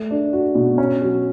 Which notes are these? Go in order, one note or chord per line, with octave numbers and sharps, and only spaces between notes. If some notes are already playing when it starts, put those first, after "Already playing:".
Already playing: A3
D4
F#4
B2
C#4
F#3